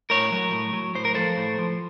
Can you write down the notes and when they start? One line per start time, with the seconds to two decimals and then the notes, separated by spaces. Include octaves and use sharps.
0.10 A2 A#4 C#5
0.32 F#3
0.52 A2
0.73 F#3
0.95 A2 C5
1.05 A#4
1.15 F3 A4 C5
1.37 A2
1.59 F3